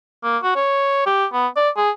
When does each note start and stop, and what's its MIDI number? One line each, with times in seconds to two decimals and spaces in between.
0.23 0.38 58
0.43 0.53 66
0.56 1.03 73
1.06 1.26 67
1.33 1.47 59
1.56 1.70 74
1.77 1.90 68